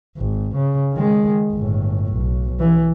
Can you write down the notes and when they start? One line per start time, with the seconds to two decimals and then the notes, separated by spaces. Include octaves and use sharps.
0.17 G#1
0.55 C#3
0.93 D#3 G#3
1.52 G1 A2
2.13 B1
2.60 E3